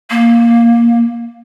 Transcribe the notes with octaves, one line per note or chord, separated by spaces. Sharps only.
A#3